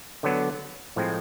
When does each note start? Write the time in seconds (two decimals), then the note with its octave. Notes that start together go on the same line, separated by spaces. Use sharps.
0.23 D3 F#3 B3
0.96 A2 F3 G#3 C4